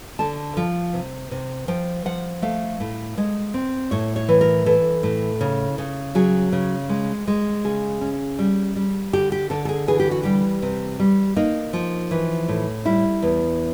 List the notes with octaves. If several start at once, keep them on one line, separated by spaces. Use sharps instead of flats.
D3 A5
F3
C3
C3
F3 G5
F3 F#5
A3 F5
A2
G#3
C4
A2 C#5
C#5
E3
A#4
E3 A4
A2
C#3
C#3
F#3 G#4
C#3
G#3
G#3
C#3 G#4
C#4
G3
G3
D3 G4
G4
D3 A4
A4
G#4
E3 G#4
G4
F#4
G3 G4
C3
G3
A#3 D#4
F3
E3
A2
G3 E4
E2